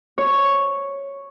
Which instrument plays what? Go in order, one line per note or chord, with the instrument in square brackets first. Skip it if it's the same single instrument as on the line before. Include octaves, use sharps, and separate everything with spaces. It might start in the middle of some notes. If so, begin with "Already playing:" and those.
[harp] C#5